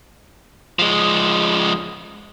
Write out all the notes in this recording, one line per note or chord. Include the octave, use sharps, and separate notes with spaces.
F3 G#3